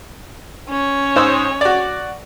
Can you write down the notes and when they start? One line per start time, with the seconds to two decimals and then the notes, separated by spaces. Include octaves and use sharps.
0.69 C#4 C#5
1.16 G#2 C5 E6
1.61 F#4 D5